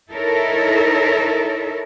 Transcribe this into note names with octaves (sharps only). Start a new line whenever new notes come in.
D#4 E4 A4 A#4 C#5 E5